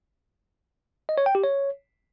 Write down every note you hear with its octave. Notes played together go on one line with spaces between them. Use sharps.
D#5
C#5
G5
G4
C#5